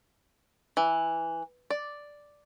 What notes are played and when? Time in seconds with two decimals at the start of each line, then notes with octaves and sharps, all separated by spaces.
0.77 E3
1.70 D5